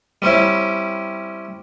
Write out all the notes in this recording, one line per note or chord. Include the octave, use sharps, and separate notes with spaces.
G3 C4 C#4 E4